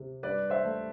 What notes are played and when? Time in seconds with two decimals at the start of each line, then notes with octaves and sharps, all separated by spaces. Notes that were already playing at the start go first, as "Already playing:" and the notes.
Already playing: C3
0.23 G2 B4 D5
0.50 C5 E5
0.65 A3